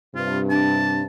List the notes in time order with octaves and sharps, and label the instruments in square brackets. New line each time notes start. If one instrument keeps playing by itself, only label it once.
[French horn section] G2 C3 [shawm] F4
[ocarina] D4 [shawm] A5